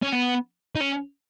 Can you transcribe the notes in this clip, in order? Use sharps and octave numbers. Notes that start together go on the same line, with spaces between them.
C#4
B3
D#4
C#4